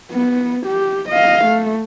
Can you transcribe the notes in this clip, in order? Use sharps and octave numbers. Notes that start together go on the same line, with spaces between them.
B3
G4
D#5 F5
A3